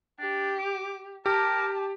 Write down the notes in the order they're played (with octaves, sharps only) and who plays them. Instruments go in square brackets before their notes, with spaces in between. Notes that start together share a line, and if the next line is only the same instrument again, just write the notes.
[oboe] D4 [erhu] G4
[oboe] D6
[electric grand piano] G4 [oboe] A#4 [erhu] A5